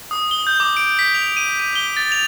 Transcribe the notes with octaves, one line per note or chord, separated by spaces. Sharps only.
D#6
G7
G6
D6
D7
B6
F7
D#7
D#7
G7
A6
F7